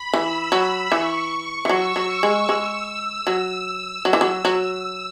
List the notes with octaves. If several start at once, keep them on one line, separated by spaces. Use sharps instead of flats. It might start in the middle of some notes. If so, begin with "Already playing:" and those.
Already playing: B5
E3 E6
F#3
E3 C#6
E3
F#3 E6
F#3
G#3
G#3
F#3
F#3 E6
E3
F#3
F#3